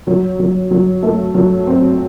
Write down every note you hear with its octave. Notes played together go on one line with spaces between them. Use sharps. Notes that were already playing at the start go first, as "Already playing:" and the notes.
F#3
F#3
F#3
A3
F#3
C4